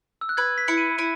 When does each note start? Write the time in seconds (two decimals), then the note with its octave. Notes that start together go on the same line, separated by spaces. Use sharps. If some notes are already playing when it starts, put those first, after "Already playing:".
0.21 E6
0.29 F#6
0.37 B4 G#6
0.58 B6
0.68 E4 C#7
0.78 D#7
0.98 E4 D#7